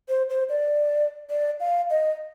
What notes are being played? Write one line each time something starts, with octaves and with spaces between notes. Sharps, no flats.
C5
C5
D5
D5
F5
D#5